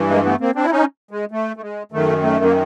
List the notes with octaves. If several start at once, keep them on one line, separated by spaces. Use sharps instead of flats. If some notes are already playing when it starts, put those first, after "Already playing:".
Already playing: G2 E3
G#3 A#3
A3 B3
A#3 C4
C4 D4
E4
C#4 D#4
G#3
A3
A3
G#3
F#2 D#3 A3
A3
A#3